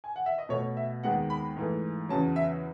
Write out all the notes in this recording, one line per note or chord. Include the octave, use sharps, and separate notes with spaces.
G#5
F#5
E5
D#5
B2 A3 C#5
E5
D#2 D#3 G#3 B3 F#5
B5
G#2 E3 A3
E2 C#3 F#3 A5
E5